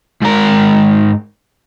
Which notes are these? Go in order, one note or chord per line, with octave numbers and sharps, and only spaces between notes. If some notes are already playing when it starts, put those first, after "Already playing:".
G#2 A#4